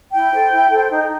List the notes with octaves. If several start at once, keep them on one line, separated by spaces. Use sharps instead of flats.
E4 G5
A4 C5
E4
A4 C5
D#4